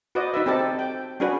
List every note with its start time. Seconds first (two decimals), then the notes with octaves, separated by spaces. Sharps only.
0.15 F#4 B4 C5 D5 D#5
0.34 D#4 B4 E5
0.46 C4 G4 A4 D5 A5
0.79 G5
1.20 C#4 D4 F#4 G#4 B4